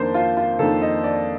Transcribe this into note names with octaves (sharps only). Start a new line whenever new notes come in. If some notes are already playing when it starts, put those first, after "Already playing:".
Already playing: F2 D#3 A#3 D4 C5
F4
F4
F2 D#3 A#3 D4 A4
D#5
D5